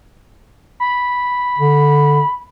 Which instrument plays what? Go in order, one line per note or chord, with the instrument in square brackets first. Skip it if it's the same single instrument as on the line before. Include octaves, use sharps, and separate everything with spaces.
[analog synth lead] B5
[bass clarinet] D3